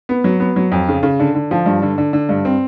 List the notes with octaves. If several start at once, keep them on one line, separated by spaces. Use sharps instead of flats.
B3
F#3
B3
F#3
F2
C#3
C#3
D3
D3
F3
G2
D3
D3
D3
G2
C4